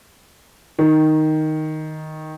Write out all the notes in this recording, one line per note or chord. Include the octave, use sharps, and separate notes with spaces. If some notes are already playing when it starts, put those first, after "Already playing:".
D#3